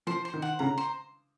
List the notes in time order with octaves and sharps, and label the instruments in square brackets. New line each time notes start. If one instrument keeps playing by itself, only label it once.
[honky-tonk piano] F3 [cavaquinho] C5
[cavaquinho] C5
[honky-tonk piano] D#3
[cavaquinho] F#5
[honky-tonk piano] C#3 [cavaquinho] A#5
[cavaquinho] C5